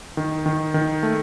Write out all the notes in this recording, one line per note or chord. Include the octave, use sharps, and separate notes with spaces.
D#3
D#3
D#3
A3